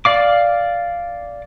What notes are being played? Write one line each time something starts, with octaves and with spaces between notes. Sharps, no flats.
D5 F5 D6